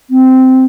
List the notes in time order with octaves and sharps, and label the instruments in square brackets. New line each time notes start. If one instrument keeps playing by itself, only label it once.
[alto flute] C4